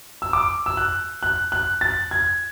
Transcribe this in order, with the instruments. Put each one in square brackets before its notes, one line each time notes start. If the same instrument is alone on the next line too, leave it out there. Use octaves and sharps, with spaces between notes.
[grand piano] E6
D6
E6
F#6
F#6
F#6
A6
G#6